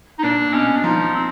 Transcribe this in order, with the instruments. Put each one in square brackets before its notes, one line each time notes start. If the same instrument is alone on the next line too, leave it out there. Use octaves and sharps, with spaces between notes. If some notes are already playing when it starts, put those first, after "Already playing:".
[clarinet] D#4
[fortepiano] A#2 [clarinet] D4
[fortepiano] B2 [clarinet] C#4
[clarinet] D4
[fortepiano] F3 [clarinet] D#4
[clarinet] C4